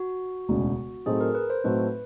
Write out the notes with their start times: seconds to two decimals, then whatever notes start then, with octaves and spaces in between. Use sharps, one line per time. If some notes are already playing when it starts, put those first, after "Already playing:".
Already playing: F#4
0.49 E1 D2 C#3
1.06 A2 F#3 A3 C4 D#4 G#4
1.21 A#4
1.35 B4
1.50 C5
1.64 A2 F#3 A3 C4 D#4 B4